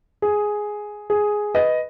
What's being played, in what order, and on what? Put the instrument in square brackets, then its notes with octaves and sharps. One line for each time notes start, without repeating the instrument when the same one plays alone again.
[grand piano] G#4
G#4
B4 D#5